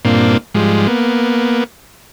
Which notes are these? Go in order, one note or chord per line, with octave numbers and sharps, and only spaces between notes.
G2 A#2 A#3 C4 D4 F4
G#2 F3 G3 G#3
A#3 B3